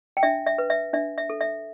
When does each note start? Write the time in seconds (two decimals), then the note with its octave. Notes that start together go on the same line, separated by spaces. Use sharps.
0.17 G5
0.23 D4 E5
0.46 E5
0.58 B4
0.70 E5
0.93 D4 E5
1.18 E5
1.30 A4
1.41 E5